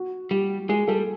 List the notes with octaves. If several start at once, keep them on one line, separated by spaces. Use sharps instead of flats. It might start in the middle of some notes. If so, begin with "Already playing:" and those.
Already playing: F#4
G3 G4
G#3 G#4
G3 A4